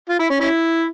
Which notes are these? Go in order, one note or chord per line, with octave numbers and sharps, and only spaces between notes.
F4
E4
C#4
C#4 E4